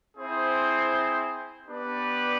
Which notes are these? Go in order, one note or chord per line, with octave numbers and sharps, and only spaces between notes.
C4 E4 G#4 C5
B3 D4 G4 B4 D5